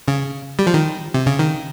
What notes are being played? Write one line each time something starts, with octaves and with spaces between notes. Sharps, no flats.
C#3
G3
F3
D#3
C3
C#3
D#3